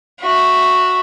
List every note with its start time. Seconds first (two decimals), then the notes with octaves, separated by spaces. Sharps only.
0.21 F#4 E5